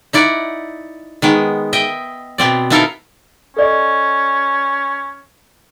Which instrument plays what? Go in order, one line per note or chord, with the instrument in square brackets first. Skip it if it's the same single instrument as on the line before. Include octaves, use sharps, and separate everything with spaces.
[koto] D#4 E4 D5 F#5
D#3 G#3 B3
D#5 E5 G5
B2 B3 C4 D5
B3 D#4 E4 A4 A#4 F5
[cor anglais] C#4 [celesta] A4 D5 D#5